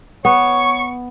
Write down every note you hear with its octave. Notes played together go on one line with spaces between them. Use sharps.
B3 C#5 C#6